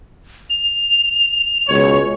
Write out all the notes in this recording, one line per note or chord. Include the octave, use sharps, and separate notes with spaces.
F7
C#2 B2 C#5